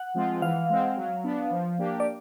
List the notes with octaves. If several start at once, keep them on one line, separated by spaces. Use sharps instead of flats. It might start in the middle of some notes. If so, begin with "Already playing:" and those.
Already playing: F#5
F3 G#3 C4 F4
E3 F5
G#3 C4
F#3
B3 D4
F3
A#3 D4 G4
D5